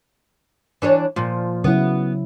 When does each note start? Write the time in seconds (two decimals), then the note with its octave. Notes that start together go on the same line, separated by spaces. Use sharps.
0.82 E3 D4 C#5
1.16 A#2 F3
1.64 C#3 F#3 B3 E4